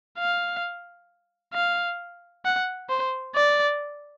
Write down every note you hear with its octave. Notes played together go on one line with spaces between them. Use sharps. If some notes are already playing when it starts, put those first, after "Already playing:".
F5
F5
F#5
C5
D5